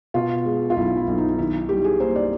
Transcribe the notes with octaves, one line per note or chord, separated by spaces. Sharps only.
B2 F4
G#3
F4
B1 E4
E4
B1
D#4
D#3 E4
G3 G4
G#4
A#3 C5
D5